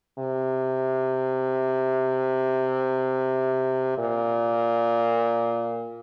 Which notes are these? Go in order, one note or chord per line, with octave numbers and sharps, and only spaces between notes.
C3
A#2